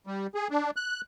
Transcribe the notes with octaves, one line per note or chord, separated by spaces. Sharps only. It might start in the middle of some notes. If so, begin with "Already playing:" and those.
G3
G#4
D4
F#6